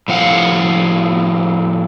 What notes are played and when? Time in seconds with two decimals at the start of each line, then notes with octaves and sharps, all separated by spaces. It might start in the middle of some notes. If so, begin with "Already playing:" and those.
0.08 A2 F3 F5 F#5